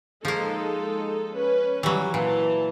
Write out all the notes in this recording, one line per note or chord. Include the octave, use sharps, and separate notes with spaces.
F3 G#3 A#3 D#4 A4
C#4 B4
E3 F#3 G3
A#2 E3 A5